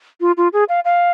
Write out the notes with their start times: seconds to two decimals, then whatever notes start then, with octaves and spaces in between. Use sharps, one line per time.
0.21 F4
0.37 F4
0.53 G#4
0.69 F5
0.85 F5